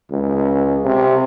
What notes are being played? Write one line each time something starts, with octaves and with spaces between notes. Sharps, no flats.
C#2
C3